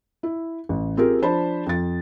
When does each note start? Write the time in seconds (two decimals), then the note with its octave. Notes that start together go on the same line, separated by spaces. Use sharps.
0.23 E4
0.69 A1
0.97 C4 F4 G4 G#4 A#4
1.22 F3 D4 C5 A5 B5
1.66 F2 A6